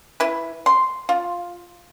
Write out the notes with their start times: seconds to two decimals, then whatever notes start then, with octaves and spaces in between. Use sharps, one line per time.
0.20 E4 B4
0.66 C6
1.09 F4